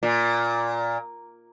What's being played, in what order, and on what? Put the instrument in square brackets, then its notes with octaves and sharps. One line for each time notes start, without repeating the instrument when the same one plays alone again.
[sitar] A#2